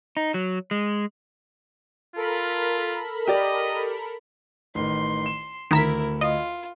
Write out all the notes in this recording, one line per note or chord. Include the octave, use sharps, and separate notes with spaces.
D#4
F#3
G#3
F4 A4 A#4 B5
G4 D5 D#5
A1 D#3 C6
E7
D2 D#3 E4 A#4 A#5 B6 E7
F4 D#5